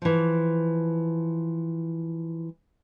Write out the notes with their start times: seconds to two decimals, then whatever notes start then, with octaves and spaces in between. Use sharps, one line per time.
0.02 E3 F3